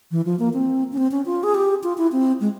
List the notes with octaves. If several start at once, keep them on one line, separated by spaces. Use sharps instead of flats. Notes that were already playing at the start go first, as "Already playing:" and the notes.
E3
F3
A#3
C4
C#4
C4
C#4
F4
G#4
G4
F4
E4
C4
G#3